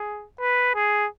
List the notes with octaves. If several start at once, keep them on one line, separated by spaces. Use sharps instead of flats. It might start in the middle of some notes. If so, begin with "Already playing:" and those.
Already playing: G#4
B4
G#4